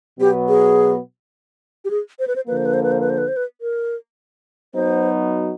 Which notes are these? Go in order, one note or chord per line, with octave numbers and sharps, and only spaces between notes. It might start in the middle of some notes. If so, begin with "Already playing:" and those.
B2 F#3 B3 G4
G#4
G4
G#4
C5
B4
C5
D3 F3 A#3 B4
C5
B4
C5
B4
C5
B4
C5
B4
C5
B4
A#4
F#3 B3 D#4 F#4 C5